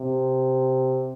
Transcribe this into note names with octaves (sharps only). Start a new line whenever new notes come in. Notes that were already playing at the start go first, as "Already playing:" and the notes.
Already playing: C3